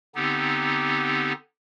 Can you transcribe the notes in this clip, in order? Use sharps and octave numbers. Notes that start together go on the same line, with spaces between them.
D3 B3 C4 D#4 G4